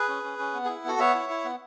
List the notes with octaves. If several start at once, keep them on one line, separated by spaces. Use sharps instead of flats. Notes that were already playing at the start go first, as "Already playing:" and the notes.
Already playing: G#4 B4
C#4
C#4
C#4
B3
E4 G#4
B3 F#4 A4
B3 C#5 E5
E4
E4
B3